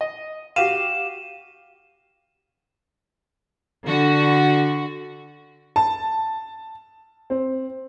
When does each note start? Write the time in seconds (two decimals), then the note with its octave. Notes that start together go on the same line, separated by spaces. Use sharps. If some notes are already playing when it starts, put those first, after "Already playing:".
0.01 D#5
0.56 F#4 G4 F5 D#7 E7
3.87 D3 F#4
5.76 A5
7.30 C4